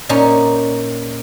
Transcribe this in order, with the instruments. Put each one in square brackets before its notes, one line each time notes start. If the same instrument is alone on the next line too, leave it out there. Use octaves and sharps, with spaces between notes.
[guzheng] A#2 C#4 D#4